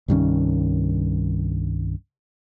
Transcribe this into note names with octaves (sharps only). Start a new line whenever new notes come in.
C2 G2 D#3 C#4